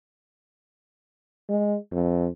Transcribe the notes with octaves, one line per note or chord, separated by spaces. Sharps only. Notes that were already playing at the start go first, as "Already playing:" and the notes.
G#3
F2